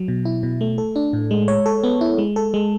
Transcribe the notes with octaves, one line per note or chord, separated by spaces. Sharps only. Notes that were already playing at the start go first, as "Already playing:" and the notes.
Already playing: F#3
B2
E4
B2
A3
A4
D4
A2
G#3
C#5
A4
B3
E4
G#3
A4
G#3